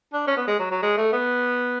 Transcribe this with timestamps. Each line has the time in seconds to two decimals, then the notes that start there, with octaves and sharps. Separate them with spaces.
0.13 D4
0.27 C#4
0.37 B3
0.47 G#3
0.59 F#3
0.71 F#3
0.83 G#3
0.97 A3
1.13 B3